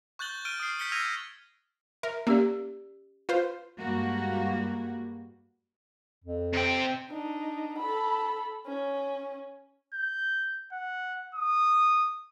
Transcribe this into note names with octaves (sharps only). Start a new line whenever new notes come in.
C#6 F#6 G6 A6 F#7 G7
F6 G6 D7 D#7 G7
D#6 F6 C7
G6 B6 C#7 G7
E6 F6 G#6 A#6 D#7 F7
A#4 E5
A#3 C#4 G4 D5
F4 B4 C5
G2 G3 G#3 A#3 F#4
F2
C3 G5
D4 D#4
A4 B5
C#4
G6
F#5
D#6